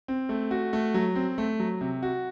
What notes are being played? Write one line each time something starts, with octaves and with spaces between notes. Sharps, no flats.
C4
A3
F#4
A3
F#3
C4
A3
F#3
C3
F#4